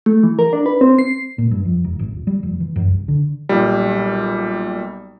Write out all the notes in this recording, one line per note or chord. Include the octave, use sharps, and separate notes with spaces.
A3
E3
A#4
D4
B4
C4
C7
A#2
G2
F2
E1
G#1
D#1
G3
F1
E3
F#2
C2
D3
B1 A#2 G3